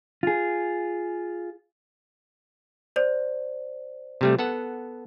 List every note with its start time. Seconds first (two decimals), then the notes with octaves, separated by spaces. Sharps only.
0.23 F4 G#4
2.96 C5 D5
4.21 C3 G3 A3
4.39 B3 A4 F#5